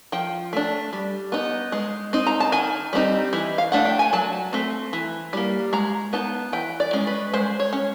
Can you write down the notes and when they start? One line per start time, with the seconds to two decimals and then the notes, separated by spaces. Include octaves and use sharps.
0.12 F3 G5
0.53 A3 D4
0.93 G3
1.32 B3 D#4
1.72 G#3
2.13 C4 D#4
2.27 A#5
2.40 A5
2.52 D#3 G#5
2.93 G3 C4 D#4
3.33 E3
3.58 F5
3.72 A3 D4 F#5
3.85 G5
3.99 G#5
4.13 F#3 A5
4.53 A3 C4
4.93 E3
5.33 G3 A#3
5.73 G#3 A#5
6.13 B3 D#4 A5
6.53 E3 G5
6.80 D5
6.93 G#3 C#4
7.07 B4
7.34 G#3 C5
7.60 C#5
7.73 C#4